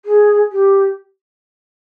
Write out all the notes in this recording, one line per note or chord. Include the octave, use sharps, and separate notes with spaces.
G#4
G4